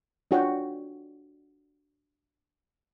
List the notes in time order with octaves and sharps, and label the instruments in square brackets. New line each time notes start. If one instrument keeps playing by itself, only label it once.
[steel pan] D4 F4 F#4 C#5 F#5 G5